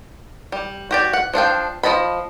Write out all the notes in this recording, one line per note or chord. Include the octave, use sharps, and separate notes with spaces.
G3
F#4 G4 D5
F#5
F3 D4 F5 G5
F3 D4 D#5 A5 B5